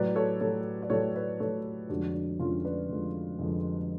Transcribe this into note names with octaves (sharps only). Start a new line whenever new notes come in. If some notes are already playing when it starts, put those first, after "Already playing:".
Already playing: A2 F#3 B4 D5
A4 C#5
A2 F#3 A4 C#5
D5
A2 F#3 A4 C#5
B4 D5
A2 F#3 A4 C#5
F2 D3 G#3 D4 F#4
D4
F2 D3 G#3 C#4 F4
B4 D5
F2 D3 G#3
F2 D3 G#3